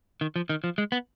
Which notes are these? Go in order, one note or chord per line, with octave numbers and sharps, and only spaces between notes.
D#3
F3
D#3
F3
G#3
B3